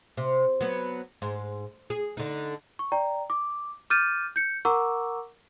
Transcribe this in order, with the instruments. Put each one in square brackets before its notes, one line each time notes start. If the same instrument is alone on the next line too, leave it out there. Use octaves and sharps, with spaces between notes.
[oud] C3
F#3 B3
G#2
G#4
D3 D#4
[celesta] C#6
D5 G5 A#5
D6
D6 F6 G6 A6 D#7
G6 C#7
A#4 F#5 A#5 C#6 D6 E6